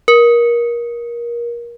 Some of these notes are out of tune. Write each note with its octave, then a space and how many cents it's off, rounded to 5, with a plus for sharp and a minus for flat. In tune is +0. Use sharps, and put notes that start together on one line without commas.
A#4 +25